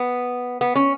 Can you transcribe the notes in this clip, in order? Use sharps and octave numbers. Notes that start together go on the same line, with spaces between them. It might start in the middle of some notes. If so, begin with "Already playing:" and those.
Already playing: B3
B3
C#4